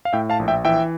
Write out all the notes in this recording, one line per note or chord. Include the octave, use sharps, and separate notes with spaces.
F5
A2 E5 G5
F5 A5
A#1
E5 G5
E3 E5 G5